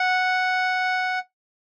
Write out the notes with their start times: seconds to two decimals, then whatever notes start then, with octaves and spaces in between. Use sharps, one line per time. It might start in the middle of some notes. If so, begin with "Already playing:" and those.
Already playing: F#5